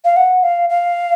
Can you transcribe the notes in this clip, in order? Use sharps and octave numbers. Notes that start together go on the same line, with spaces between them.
F5
F#5
F5
F5